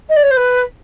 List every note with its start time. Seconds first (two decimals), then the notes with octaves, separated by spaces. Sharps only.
0.10 D#5
0.16 D5
0.23 C#5
0.31 C5
0.37 B4